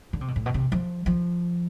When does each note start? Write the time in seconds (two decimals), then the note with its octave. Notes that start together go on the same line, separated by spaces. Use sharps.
0.13 D3
0.21 C3
0.28 B2
0.36 A2
0.46 B2
0.54 C3
0.72 F3
1.06 F3